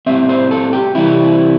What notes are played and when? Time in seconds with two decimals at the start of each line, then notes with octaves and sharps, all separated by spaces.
0.06 A2 G3 C4 E5
0.29 C5
0.51 A4
0.73 G4
0.95 C3 E3 G3 C4 E4